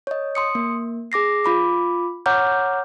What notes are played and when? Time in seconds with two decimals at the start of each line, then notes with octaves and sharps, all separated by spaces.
0.07 C#5 D#5
0.35 C6 D#6 C#7
0.55 A#3
1.12 G#4 D6 A#6 C7
1.44 F4 B5 D6
2.26 C#5 F#5 A#5 D6 F6 G6